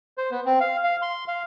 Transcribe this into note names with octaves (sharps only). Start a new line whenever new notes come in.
C5
B3
C4
F5
F5
C6
F5